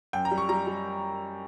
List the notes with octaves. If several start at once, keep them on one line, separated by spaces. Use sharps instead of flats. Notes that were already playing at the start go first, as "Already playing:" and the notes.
F#2 G5
A#5
G3
C#6
G3 A#5
G3